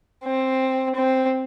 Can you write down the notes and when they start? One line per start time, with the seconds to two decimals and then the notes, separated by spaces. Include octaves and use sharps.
0.24 C4
0.95 C4